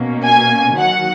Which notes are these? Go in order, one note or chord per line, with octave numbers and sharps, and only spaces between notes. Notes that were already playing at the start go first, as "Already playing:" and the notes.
Already playing: B2 A#3 C#4
G#5
D#3 F#3 A#3 F#5